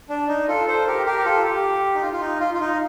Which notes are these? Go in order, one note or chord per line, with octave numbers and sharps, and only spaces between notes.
D4
D#4
F4 A4
A4 C5
G4 A#4
G4 A#4
G4
F4 A4
G4
D#4
F4
F4
D#4
F4
F4
D#4